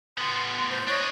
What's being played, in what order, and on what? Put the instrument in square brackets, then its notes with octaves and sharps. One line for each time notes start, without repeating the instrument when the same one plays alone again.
[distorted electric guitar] A2 B3 [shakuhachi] C6
[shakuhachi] C5
[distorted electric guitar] D4 D#5 [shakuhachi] C#5